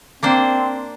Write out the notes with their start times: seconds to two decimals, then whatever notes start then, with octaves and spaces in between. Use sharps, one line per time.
0.23 A#3 C4 D4 C5